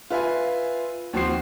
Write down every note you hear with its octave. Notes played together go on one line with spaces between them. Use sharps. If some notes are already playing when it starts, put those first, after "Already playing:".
F4 B4 E5 F5 G#5
D#2 F3 C4 F#4 C6 C7